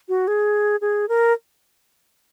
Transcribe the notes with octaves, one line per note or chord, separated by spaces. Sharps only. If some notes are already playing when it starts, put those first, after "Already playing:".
F#4
G#4
G#4
A#4